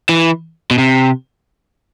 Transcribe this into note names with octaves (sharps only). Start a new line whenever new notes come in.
E3
B2
C3